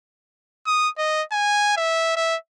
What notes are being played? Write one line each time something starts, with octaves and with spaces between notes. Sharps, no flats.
D#6
D#5
G#5
E5
E5